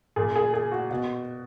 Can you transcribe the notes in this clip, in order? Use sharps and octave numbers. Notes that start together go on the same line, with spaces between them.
A#2 G#4
G#4
G#4
F#4
B2 F#4